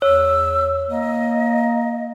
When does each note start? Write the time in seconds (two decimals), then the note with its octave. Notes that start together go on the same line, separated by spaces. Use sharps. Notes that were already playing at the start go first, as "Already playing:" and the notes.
0.02 E2 C#5 E6
0.91 A#3 D#5